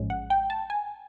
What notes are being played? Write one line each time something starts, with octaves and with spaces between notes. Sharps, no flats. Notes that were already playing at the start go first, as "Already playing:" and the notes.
Already playing: A1 G#2 F3 G#3 C#4
F#5
G5
A5
G#5